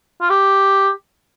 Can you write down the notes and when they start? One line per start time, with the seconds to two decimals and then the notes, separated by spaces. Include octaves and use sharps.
0.21 F4
0.30 G4